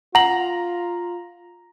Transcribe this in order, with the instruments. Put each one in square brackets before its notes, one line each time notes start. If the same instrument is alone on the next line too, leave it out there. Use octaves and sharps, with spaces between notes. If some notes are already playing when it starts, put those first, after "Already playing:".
[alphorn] F4 [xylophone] F#5 F#7 [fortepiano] A#5